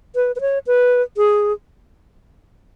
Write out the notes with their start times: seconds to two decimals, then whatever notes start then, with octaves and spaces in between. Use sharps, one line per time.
0.15 B4
0.36 B4
0.41 C#5
0.67 B4
1.17 G#4